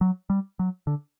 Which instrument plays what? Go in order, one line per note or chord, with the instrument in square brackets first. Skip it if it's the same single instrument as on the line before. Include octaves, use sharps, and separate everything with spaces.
[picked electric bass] F#3
G3
F#3
D3